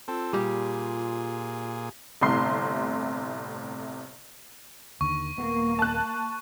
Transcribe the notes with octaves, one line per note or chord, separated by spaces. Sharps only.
C4 F4 A4
A#2 G3 G4 G#4
G1 A2 C3 E4 C6 C7
D#2 D3 D#3 C#6
D#1 A#3 B3
A5 F#6